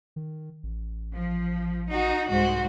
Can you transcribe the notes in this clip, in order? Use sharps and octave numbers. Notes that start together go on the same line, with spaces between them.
D#3
A1
F3
D#4 F#4
C2 G#2 F#4 C5